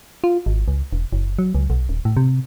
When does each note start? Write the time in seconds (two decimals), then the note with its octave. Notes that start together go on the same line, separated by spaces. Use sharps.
0.24 F4
0.46 G#1
0.68 C#2
0.93 E1
1.13 F#1
1.39 F#3
1.55 C#2
1.70 B1
1.89 D#1
2.05 A2
2.17 C3